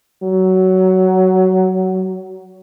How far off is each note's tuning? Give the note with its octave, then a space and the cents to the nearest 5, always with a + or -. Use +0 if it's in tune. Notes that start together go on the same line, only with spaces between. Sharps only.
F#3 +15